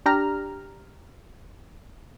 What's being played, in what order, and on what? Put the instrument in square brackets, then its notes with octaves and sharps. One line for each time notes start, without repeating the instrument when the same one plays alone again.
[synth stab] D4 G4 A#5 F6